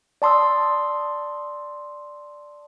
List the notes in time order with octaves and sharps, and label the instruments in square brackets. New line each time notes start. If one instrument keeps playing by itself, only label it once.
[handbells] D5 A5 C6 D#6 E6